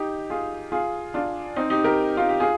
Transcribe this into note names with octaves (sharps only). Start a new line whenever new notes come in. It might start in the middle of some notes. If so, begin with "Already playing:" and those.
Already playing: D#4 G4
F4 G#4
F4 G#4
D4 F4
C4 D#4
D#4 G4
G4 A#4
F4
G4
F4 G#4